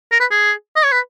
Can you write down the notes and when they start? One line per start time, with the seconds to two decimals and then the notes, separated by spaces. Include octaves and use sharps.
0.12 A#4
0.20 B4
0.31 G#4
0.76 D#5
0.84 C#5
0.92 B4